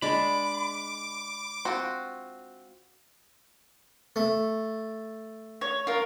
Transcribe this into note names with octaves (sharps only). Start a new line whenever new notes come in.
G#3 D4 B5 D6
C4 F4 F#4
A3
C#5
F4 A#4